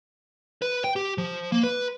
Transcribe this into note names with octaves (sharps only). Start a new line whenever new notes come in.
B4
G5
G4
F3
A#3
B4